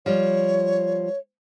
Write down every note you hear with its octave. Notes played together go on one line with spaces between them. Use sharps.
F3 G3 C#5